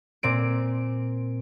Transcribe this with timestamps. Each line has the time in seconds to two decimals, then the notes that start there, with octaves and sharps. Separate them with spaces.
0.23 A#2 C4 D7